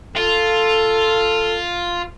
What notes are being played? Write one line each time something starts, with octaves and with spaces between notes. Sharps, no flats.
F4 A4